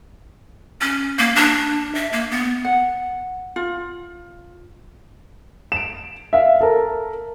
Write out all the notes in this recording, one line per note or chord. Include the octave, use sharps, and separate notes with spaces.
C#4
A#3
D4
E5
A#3
B3
F#5
F4
D7 E7
E5 F5
A4 A#4